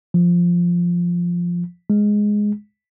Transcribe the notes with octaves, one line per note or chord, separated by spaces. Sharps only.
F3
G#3